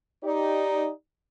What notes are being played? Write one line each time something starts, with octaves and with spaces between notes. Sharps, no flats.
D#4 G4 D5